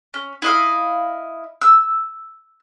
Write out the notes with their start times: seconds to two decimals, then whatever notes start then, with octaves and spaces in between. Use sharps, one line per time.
0.14 C#4
0.42 E4 D#5 F5
1.62 E6